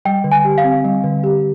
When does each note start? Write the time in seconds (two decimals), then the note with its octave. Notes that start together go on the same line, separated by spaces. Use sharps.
0.05 G3 G5
0.24 D3
0.32 G#5
0.45 G4
0.58 F5
0.64 C4
0.85 G3
1.04 D3
1.23 G4